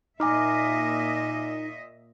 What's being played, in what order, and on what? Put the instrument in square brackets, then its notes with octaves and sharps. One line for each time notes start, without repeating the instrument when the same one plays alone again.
[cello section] A#2 D#5 E5 [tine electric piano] D#4 [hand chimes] G#5 D6 F6